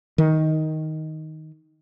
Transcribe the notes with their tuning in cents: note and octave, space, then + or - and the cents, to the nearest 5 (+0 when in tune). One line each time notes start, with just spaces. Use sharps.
D#3 +10